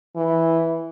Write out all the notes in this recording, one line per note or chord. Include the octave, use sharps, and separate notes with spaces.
E3